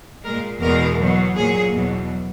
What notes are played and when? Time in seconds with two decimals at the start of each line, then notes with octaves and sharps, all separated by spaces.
0.24 A#2 G#3 A#4
0.60 E2 B2 G#3 A#4
0.99 B2 F#3
1.35 A#2 F#3 G#4
1.72 E2 B2 F#3